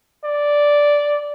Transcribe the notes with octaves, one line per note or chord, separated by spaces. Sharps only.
D5